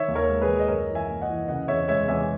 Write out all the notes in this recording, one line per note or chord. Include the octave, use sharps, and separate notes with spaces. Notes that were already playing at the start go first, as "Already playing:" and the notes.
Already playing: D#3 C#5 E5
D#2
A#4 C#5
G#3
G#4 B4
D#2
D#5
F#2 A#4 C#5
E3
E5 G#5
A#3
D#5 F#5
E3
C#3 D#5 F#5
E2 C#5 E5
G#3 C#5 E5
E2 E5 G#5